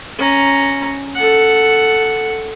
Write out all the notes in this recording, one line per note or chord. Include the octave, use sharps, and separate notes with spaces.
C#4 A#5
A4 F#5